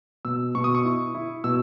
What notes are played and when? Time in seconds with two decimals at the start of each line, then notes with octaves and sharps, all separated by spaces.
0.25 B2 E6
0.55 B2 C#6
0.64 D#6
0.75 C#6
0.85 E4
1.15 E4
1.44 B2 E6